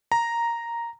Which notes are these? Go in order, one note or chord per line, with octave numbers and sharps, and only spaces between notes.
A#5